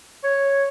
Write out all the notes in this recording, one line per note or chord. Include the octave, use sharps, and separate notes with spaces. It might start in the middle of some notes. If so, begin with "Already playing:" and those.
C#5